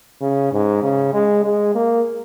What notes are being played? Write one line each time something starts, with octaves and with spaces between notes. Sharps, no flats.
C#3
G#2
C#3
G#3
G#3
A#3